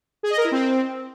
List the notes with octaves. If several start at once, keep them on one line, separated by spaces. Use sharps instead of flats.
G#4
D#5
A#4
E4
C4